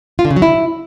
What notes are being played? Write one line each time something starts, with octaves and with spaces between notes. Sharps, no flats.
F4
D3
C#3
F#3
E4